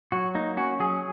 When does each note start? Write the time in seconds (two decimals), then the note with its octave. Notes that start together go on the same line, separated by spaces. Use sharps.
0.12 F#3 F#4
0.35 A#3 D#4
0.57 C#4 F#4
0.80 F#3 G#4